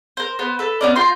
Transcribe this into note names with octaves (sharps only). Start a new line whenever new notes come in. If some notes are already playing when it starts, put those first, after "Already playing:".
A#4 C5
B3 B4 C5
A4 B4
B3 C#4 D5
F4 G5 A#5 C6